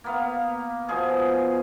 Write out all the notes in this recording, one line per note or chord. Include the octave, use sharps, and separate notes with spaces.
A#3 B3 F5
B2 F3 G#4